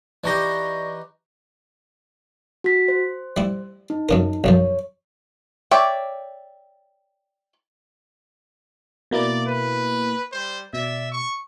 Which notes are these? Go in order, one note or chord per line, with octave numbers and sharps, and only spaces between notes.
E3 D#4 G4 D5 C#6 A#6
F#4 B6
C5
G3 E4
D#4
F#2 C#3 A#4
B1 F#2 F3 C#5
C#5 D5 E5 G5
B2 A#3 E4 D5
B4
G3 C5
B2 D5 E5
C#6